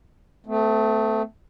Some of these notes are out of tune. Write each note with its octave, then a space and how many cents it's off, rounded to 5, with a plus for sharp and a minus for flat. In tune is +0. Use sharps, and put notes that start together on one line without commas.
A3 +0 C4 -45